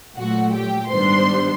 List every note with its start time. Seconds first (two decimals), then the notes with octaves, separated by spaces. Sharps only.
0.16 A#2 F#3 A3 F#4 F#5
0.54 G4 G5
0.91 G#2 D#3 G3 B3 D4 C5 C6